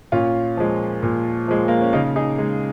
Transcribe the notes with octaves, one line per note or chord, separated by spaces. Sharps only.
A#2 C#4 F4
F3 G#3
A#2
F3 G#3
A#3
C#4
C#3 A#3 D#4
D#4 G#4
G#3